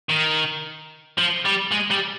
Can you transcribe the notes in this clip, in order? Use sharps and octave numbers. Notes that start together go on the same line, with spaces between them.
D#3
F3
G3
G#3
G3